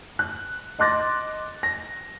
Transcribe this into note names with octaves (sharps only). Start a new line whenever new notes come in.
F#6
D#5 C6 D6 F#6 A6 A#6
A#6